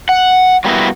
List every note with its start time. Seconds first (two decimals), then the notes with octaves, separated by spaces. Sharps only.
0.09 F#5
0.65 F#3 G3 A#3 B3 E4 F#4